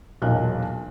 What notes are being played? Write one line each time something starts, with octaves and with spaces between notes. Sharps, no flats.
E1 B1 A#2 A#4 F5 F#6